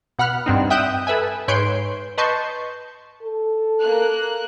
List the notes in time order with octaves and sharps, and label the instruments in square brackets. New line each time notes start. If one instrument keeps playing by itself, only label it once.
[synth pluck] B2 F#5 B5 F6 F#6
G2 C4 D#4
E5 G5 D#6 F#6 G6 E7
A4 B4 E5 G#5
G#2 B4 C#5 C6 G6 D7
B4 D#5 A5 C6 C#6 G6
[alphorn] A4
[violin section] A#3 F#6